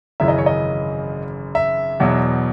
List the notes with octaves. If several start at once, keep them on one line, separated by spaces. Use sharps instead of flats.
G#1 F#2 C#3 E3 E5
D#5
C#5
D#5
E5
E2 B2 F#3